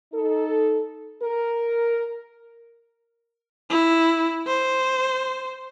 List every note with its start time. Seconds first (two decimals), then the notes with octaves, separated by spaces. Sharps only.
0.13 D#4 A4
1.22 A#4
3.70 E4
4.47 C5